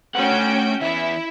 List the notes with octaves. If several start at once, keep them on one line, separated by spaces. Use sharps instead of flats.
A3 C#4 F#4 F#5 G5
E3 B3 E4 E5